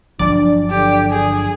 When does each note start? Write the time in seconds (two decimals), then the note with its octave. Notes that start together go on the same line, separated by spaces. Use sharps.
0.19 G1 F3 F#3 D4 D5
0.70 D3 G4
1.11 D3 G#4